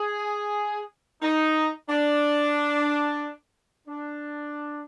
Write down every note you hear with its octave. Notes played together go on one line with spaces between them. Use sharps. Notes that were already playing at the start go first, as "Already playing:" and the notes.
Already playing: G#4
D#4
D4
D4